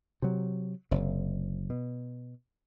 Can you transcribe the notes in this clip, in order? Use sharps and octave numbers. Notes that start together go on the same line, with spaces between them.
C3 F#3
F#1 C3
B2